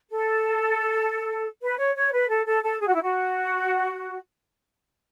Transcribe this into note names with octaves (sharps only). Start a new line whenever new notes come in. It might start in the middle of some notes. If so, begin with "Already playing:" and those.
A4
B4
C#5
C#5
B4
A4
A4
A4
G#4
F#4
E4
F#4